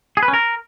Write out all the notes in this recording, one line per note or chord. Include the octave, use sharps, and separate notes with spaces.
G#4
B4
C#4
A#4